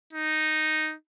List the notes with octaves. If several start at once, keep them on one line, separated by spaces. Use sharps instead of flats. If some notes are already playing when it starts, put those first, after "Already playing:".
D#4